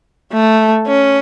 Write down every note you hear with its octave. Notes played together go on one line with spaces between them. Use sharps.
A3
C#4